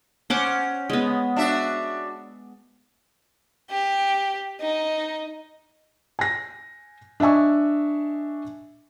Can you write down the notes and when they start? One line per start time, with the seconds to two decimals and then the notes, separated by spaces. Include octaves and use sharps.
0.30 C#4 C5 F#5 D6
0.90 G#3 B3
1.36 D4 F#4 E5
3.71 G4
4.61 D#4
6.19 G#5 A#6
7.20 D4 D#5 E5 G#5 C#6